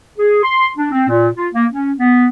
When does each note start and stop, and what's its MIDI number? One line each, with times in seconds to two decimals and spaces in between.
0.17 0.41 68
0.43 0.69 84
0.76 0.90 62
0.92 1.06 60
1.08 1.28 46
1.35 1.47 65
1.54 1.65 58
1.72 1.91 61
1.98 2.26 59